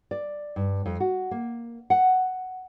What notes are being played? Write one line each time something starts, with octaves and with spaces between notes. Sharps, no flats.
D5
G2
F2
F#4
A#3
F#5